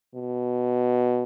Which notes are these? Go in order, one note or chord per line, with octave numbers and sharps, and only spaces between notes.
B2